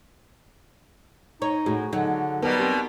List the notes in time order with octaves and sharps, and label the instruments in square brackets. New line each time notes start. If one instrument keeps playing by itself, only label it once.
[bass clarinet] D#4 [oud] C#5
[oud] A2 [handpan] F#4 G#4
[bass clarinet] D3 [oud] F#3 [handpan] D#4
[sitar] B2 G3 [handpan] B3 A#4
[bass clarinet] C4 [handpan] G4